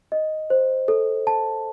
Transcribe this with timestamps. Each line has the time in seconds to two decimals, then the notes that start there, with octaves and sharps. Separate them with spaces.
0.12 D#5
0.50 C5
0.88 A4
1.27 A5